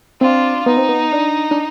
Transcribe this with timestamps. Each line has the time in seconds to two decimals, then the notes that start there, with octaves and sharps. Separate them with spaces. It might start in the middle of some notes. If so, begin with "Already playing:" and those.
0.21 C4 D4 F4
0.66 B3 D#4
0.77 C4
0.89 B3
1.12 D4
1.51 D4